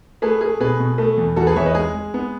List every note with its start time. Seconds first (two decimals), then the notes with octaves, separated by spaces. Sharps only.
0.22 A3 G#4 B4
0.41 A3 G#4
0.60 B2 G#4 B4
0.80 B2
0.98 A3
1.17 E2
1.36 E2 F#4 A4
1.47 G#4 B4
1.56 E2 C#5 E5
1.66 B4 D#5
1.75 G#3 G#4
1.94 G#3
2.14 B3